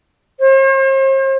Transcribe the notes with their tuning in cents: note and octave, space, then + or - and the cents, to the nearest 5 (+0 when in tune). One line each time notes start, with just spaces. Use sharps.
C5 +45